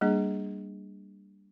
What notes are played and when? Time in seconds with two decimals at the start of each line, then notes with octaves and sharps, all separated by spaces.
0.01 G3 A#3 D4 G#4